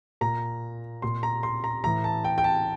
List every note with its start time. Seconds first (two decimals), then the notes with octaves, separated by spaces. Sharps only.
0.21 A#2 A#5
1.02 A#2 C6
1.23 A#5
1.43 C6
1.64 A#5
1.84 A2 E3 A#5
2.04 A5
2.24 G5
2.38 G5
2.44 A5